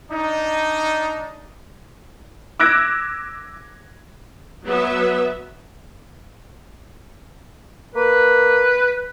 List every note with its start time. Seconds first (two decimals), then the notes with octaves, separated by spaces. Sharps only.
0.10 D4 D#4
2.59 D6 E6 F#6 G#6 A#6 D7
4.65 F#3 B3 E5
7.95 A#3 B4